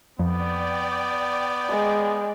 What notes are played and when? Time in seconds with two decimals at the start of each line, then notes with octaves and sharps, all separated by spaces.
0.19 F2 B3 D5 G5
1.70 G#3